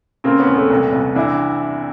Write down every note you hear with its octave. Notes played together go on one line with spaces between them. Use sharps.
C#3 A#3 C4
B3 C#4
E2
A3 B3
C2
C2
E3 D4 E4